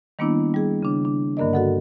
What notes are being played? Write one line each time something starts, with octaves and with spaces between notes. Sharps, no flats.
D#3 G3 A#3 B3 D4 E4
G3 G#4
C#3 D4
D4
G2 D3 A#3 A#4 D5 D#5
F#4 A4 F#5